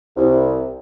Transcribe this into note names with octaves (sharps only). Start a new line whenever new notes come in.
C2